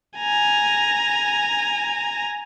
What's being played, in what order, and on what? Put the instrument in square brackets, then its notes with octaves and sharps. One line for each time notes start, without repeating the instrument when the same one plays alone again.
[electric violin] G#5 A#5